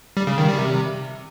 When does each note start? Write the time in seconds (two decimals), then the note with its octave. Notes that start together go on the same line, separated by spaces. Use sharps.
0.17 G3
0.27 C#3
0.38 D#3
0.48 G3
0.59 C3